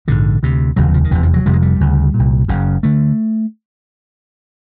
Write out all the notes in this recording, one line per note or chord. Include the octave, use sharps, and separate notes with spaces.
A#1 G#2 D3
D2 C3
F1 D#2 C#3 F#3
F3
D#3
F1 E2 C3 E3
F3
F#3
F1 F2 C3 G3
G#3
G3
D2 C#3
A#2
C2
F#1 F#2 C#3
D3 A3